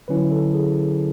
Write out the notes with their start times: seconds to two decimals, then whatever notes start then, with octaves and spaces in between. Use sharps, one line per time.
0.08 D3 F#3 C#4 E4 B4
0.32 A4
0.54 G#4